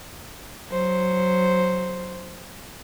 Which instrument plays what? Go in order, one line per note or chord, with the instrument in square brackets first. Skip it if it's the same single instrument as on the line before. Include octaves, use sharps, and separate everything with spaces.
[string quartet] F#3 C5